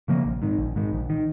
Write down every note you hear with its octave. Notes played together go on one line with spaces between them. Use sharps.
C#3 F3 A#3
A#1
G#2 D#3
A#1
G#2 D#3
A#1
D#3